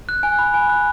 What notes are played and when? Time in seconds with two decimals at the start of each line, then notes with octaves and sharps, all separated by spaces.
0.09 F#6
0.23 G#5
0.39 B5
0.54 G#5
0.69 F#6